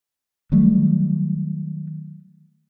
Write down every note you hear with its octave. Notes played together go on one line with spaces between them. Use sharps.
D#3 F#3 G3 A3